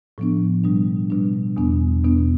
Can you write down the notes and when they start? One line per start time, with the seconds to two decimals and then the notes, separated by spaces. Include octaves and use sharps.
0.18 A2 F3 B3 D4
0.64 B2 G3 D4
1.10 B2 G3 D4
1.57 E2 B2 B3 D4
2.04 E2 B2 B3 D4